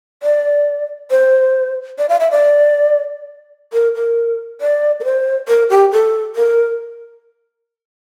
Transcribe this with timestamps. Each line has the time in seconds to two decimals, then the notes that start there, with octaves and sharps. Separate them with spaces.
0.23 D5
1.11 C5
1.98 D5
2.09 F5
2.20 E5
2.31 D5
3.73 A#4
3.95 A#4
4.61 D5
5.00 A#4
5.05 C5
5.48 A#4
5.70 G4
5.92 A4
6.36 A#4